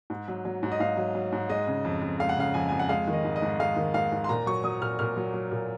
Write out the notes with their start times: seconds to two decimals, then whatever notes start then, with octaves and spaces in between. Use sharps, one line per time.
0.10 G#2
0.28 F#3
0.45 F#3
0.63 G#2
0.72 D#5
0.80 G#2 F5
0.97 F#3
1.15 F#3
1.32 G#2
1.49 G#3 D#5
1.67 C#3
1.85 F2
2.02 F2
2.20 G#3 F5
2.29 F#5
2.37 C#3 F5
2.54 F2 G#5
2.69 F2 G#5
2.79 F#5
2.89 G#3 F5
3.08 D#3
3.13 D#5
3.24 G#2
3.36 D#5
3.42 G#2
3.59 G#3 F5
3.76 D#3
3.94 G#2 F5
4.12 G#2
4.24 C6
4.29 A#2 A#5
4.46 F#3 C#6
4.64 F#3 D#6
4.81 A#2 F6
4.99 A#2 F6
5.17 F#3
5.34 F#3
5.52 A#2